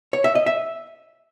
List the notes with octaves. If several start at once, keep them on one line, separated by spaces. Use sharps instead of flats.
C#5
E5
D#5
E5